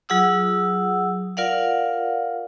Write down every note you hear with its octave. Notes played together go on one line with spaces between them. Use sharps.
F#3 F4 G#4 F#5 D#6 E6
F4 A#4 D5 F5 F#5